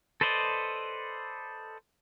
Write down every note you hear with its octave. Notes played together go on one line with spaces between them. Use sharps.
A4 B4 C5 D5 D#5